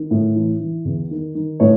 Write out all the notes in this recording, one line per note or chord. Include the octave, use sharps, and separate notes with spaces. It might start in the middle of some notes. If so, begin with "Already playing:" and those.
Already playing: D#3
A2
E3
E3
E2
D#3
D#3
A2 C#5